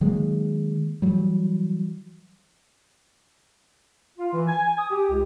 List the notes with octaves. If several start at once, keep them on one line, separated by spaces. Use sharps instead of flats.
D#3 F#3 G#3 A#3
E3 F#3 G3
F4
E3
G#5
G#5
D#6
G4
C#2